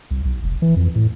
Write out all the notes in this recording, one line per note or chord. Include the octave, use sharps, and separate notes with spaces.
C2
B1
F1
E3
F2
A2